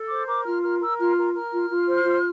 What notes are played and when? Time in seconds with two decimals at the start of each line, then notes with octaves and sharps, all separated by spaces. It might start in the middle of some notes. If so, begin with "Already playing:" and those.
Already playing: A4
0.09 C5 D6
0.27 A#4 D6
0.45 F4 F6
0.62 A#4 F6
0.80 A#4 E6
0.99 F4 F6
1.17 A#4
1.34 A#4 F6
1.52 F4
1.70 F4
1.87 C5
2.05 F4